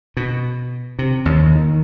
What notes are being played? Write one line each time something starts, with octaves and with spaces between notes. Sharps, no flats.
B2
C3
D#2
D#3